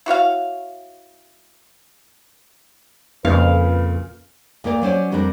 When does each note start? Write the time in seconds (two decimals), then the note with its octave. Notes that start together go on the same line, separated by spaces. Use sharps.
0.06 E4 F#4 C#5 F5
3.25 F2 A#2 C#3 B4 F5
4.64 D2 A#3 A#4 D5
4.82 F#3 C#4 C5 D5
5.12 F2 G3 C4 D4 A#4